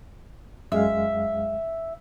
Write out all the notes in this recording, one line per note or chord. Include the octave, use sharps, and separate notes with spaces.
F#2 G#3 E5 F5